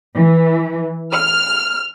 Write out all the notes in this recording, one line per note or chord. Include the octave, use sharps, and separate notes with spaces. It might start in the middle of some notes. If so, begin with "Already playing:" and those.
E3
F6